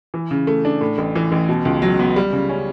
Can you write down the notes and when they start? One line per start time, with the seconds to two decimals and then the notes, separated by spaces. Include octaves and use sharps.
0.14 E3
0.31 C#3
0.47 A3
0.65 D4
0.81 A2
0.98 A1
1.15 E3
1.32 A1
1.49 B2
1.65 C#2
1.82 F#3
1.99 B3
2.16 G3
2.33 C#3
2.49 C#4